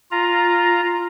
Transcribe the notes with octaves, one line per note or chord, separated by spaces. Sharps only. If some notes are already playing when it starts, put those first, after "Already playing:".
F4 A#5